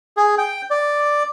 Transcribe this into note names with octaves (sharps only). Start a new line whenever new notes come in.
G#4
G5
D5